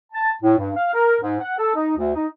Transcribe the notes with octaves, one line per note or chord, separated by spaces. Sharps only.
A5
A2
G2
F5
A#4
G#2
F#5
A4
D#4
D2
D#4